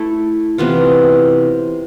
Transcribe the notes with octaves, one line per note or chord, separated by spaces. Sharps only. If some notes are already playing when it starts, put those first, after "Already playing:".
Already playing: A3 E4 A4
C3 E3 B3 F4